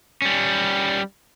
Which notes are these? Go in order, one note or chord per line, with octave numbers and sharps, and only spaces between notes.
G3 C#4